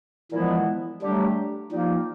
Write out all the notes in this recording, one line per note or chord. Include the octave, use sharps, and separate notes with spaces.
A#2 E3 F3 G#3 B3 E4
D3 F#3 G3 A3 D4 G4
F3 G3 A#3 D#4